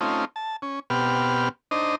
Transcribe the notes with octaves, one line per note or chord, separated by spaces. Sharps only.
A3 C4 C#4 D#4 F4
A5
C#4
B2 B3 C4 G4 F6
D4 D#4 C5 D#5